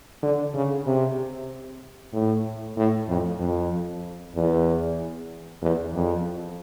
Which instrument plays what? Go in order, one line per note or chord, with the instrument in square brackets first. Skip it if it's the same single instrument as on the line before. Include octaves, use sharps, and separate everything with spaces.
[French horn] D3
C#3
C3
A2
A2
F2
F2
E2
E2
F2